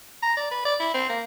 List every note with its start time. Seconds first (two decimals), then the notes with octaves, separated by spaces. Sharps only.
0.22 A#5
0.37 D5
0.51 B4
0.65 D5
0.80 E4
0.94 C4
1.09 A#3